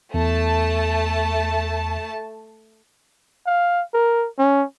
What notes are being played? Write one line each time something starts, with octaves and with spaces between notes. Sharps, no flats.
E2 A3 A5
F5
A#4
C#4